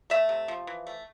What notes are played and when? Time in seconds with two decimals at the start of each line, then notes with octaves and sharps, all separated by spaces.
0.10 A3 E5
0.29 C3
0.48 F3
0.67 E3
0.87 A3